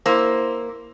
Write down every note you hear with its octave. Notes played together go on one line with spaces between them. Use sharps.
A#3 E4 C5